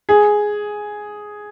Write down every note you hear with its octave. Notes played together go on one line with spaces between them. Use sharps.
G#4